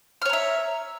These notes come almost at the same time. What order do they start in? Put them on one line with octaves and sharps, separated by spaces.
F6 C#5 A#5 E5